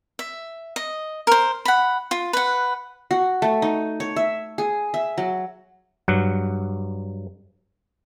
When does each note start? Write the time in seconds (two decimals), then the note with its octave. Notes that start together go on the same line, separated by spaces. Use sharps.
0.19 E5
0.76 D#5
1.27 A#4 C5
1.65 F#5 B5
2.11 F4
2.33 B4 F#5
3.11 F#4
3.42 A3
3.62 D#4
4.00 C#5
4.16 E5
4.58 G#4
4.94 E5
5.18 F#3
6.08 G2 F#3 F#5